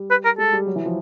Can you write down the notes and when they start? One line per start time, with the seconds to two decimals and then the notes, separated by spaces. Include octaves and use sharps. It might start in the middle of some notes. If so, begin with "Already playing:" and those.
Already playing: G3
0.10 B4
0.25 A#4
0.38 G#3 A4
0.53 G3
0.67 F#3
0.76 E3
0.86 F3